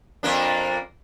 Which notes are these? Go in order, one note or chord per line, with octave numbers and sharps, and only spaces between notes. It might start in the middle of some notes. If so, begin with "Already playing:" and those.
F2 A#3 D4